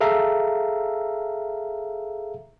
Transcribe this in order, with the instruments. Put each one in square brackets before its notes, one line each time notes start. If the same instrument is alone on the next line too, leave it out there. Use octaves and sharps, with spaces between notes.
[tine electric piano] G#4 A4 E5 F5 A#5